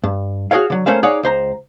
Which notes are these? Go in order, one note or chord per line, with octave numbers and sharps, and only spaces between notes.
G2
F#4 G#4 A#4 C#5 F5
D3 F#3
A3 A#3 C#4 C5 F5
D#4 G#4 C#5 D5 F5 F#5
C#2 C5 A#5